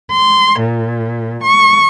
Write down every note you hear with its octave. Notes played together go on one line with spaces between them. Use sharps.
C6
A#2
C#6